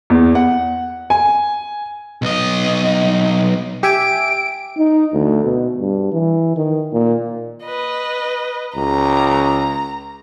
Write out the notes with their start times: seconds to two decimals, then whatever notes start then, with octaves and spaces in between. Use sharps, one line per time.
0.10 E2
0.35 F#5
1.10 G#5
2.22 B1 D#5
3.83 G4 E5 G#5 D7
4.78 D#4
5.13 D2
5.44 B2
5.78 G2
6.13 E3
6.56 D#3
6.93 A#2
7.65 B4 D#5
8.76 C#2 A#5